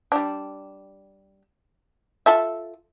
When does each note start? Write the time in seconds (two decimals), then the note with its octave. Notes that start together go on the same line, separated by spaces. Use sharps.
0.12 G3 D4
2.26 F4 A4 E5